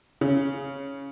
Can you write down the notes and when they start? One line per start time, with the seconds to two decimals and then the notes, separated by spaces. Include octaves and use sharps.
0.21 C#3